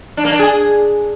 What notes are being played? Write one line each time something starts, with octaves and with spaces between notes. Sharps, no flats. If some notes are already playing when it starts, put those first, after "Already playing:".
D4
A#3
D4
G#4